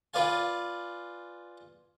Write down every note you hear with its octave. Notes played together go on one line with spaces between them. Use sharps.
F4 B4 D5 F5 G#5